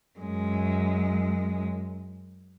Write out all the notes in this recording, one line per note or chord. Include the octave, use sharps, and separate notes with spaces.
F#2 G#3